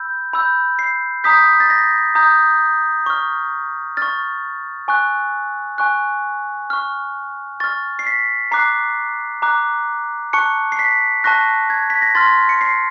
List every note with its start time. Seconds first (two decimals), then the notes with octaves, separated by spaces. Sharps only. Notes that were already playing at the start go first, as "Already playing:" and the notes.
Already playing: B5 E6 G6
0.33 B5 E6 G6
0.79 C7
1.24 A#5 D#6 G6 B6
1.60 A6
1.70 A#6
2.15 A#5 D#6 G6
3.06 C#6 F6
3.97 C#6 F6 A6
4.88 G#5 C#6 F#6
5.78 G#5 C#6 F#6
6.70 C#6 F6
7.60 C#6 F6 A6
7.99 C7
8.07 B6
8.51 A#5 D6 F#6 C7
9.42 A#5 D6 F#6
10.33 A5 C#6 F#6 C#7
10.72 C7
10.79 B6
11.24 A5 C#6 F#6 A#6
11.70 G#6
11.90 B6
12.02 A#6
12.15 C6 F6 A6
12.49 C#7
12.61 C7